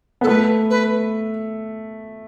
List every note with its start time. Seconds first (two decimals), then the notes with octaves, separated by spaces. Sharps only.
0.21 B3 A4
0.27 A3 B4
0.70 B4